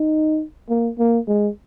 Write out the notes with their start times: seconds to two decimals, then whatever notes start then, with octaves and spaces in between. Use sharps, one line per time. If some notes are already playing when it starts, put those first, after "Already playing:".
Already playing: D#4
0.69 A#3
0.98 A#3
1.27 G#3